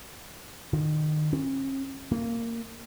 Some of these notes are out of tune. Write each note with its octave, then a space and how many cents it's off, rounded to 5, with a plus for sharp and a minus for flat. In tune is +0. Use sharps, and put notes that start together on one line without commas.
D#3 -30
C#4 -45
A#3 -15